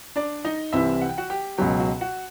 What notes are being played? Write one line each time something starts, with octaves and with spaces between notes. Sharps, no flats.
D4 D5
D#4 D#5
C2 C3 E3 E4 E5
F#5
G5
F#4 F#5
G4 G5
C#2 B2 F#3 G4 G5
F#4 F#5
F#4 F#5